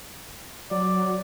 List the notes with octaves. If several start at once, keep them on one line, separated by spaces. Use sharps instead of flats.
F#3 D5